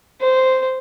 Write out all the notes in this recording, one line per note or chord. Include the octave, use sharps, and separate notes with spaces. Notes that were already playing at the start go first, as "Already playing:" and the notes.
C5